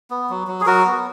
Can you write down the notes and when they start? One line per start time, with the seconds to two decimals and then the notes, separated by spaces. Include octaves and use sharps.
0.10 B3
0.30 F#3
0.48 F#3
0.61 G#4
0.66 F#3 F#4 A#4
0.85 B3